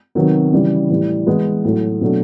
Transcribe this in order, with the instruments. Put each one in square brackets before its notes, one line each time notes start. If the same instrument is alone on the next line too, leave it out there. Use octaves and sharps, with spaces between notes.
[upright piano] C3 D#3 F#3 B3
C#3 E3 G3
A2 E3 G3
E3 G#3 B3
A2 F#3 A3
B2 F#3 A3 D4